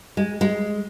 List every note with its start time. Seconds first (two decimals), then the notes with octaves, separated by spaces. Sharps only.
0.17 G#3
0.41 G#3